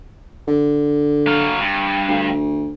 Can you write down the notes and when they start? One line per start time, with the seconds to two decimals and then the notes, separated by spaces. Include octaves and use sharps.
0.47 D3
1.27 F#3 F5
1.60 G2
2.07 D2